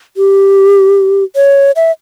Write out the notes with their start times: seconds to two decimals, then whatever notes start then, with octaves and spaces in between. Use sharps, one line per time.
0.17 G4
1.36 C#5
1.76 E5